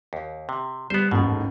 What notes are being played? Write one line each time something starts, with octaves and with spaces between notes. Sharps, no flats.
D#2
C3
G3 B3 C5
A1 D#2 G#2 B2